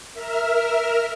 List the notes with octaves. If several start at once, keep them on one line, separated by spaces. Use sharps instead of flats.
A#4 E5 F6